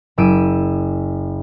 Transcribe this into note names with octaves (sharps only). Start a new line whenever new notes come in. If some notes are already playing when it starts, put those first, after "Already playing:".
F#1 E6 D7 D#7